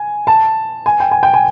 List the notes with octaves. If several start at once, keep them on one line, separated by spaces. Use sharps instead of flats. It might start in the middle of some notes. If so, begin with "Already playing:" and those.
Already playing: G#5
A5
G#5
G5
G#5
G5
G#5